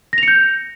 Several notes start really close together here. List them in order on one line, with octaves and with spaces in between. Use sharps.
A#6 F7 C#7 G6